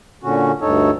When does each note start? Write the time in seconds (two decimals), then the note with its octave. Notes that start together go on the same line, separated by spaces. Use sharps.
0.24 A#2 D3 C#4 F#4
0.61 D2 G2 D#4 A4 C#5